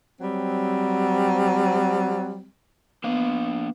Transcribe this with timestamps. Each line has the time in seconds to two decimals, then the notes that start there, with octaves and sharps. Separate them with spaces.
0.20 F#3 G3 C4
3.04 A#3 B3 D4 F5